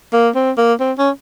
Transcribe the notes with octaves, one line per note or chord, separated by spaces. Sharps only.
A#3
C4
A#3
C4
C#4